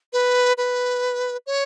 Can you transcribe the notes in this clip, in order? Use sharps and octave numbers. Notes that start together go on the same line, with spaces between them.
B4
B4
C#5